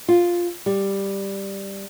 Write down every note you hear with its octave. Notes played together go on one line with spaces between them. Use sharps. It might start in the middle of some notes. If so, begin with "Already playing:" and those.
F4
G3